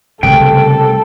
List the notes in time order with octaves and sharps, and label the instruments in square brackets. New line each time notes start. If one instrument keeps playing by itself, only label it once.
[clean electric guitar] C2 [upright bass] C#3 A3 [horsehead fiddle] A4 [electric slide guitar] G5